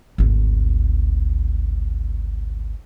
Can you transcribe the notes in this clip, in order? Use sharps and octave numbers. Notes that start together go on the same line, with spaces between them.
G#1 D2